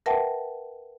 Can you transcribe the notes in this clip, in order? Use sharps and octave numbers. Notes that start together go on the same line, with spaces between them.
A#4 B4 E5 F#5 G5 A5